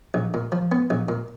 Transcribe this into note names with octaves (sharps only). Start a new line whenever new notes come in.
A#1
A#2
F3
B3
A#1
A#2